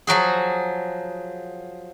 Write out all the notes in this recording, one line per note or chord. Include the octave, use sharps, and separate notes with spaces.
F3 F#3 F#4 G#4